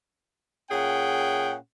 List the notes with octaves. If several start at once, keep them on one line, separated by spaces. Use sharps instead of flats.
A#2 C#4 G#4 F#5 G5